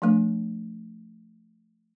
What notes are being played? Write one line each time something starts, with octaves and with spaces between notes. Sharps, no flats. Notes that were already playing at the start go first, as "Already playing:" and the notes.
F3 A3 D4